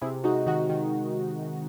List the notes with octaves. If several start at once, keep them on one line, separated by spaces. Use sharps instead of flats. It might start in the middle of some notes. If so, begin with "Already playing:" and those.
C3 E4 G#4
G#3 D#4 F#4
D#3 D#4 F#4
D#3